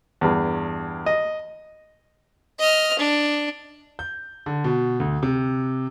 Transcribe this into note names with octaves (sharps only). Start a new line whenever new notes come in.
E2 G2
D#5
D#5 F6
D4
G6
D3
B2
D2
C3